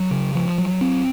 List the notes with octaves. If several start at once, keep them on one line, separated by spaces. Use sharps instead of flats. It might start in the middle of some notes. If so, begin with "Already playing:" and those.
Already playing: F#3
C#3
F3
F#3
C4